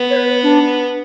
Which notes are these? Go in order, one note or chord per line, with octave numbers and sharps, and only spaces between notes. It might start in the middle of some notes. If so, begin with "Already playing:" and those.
Already playing: B3
C#5
B4
D4